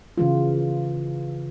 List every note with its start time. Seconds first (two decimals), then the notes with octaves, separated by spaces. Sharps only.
0.18 C#3 E3 G#3 F4